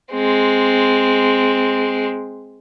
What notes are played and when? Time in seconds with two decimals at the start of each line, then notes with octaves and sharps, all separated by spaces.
0.13 G#3 C4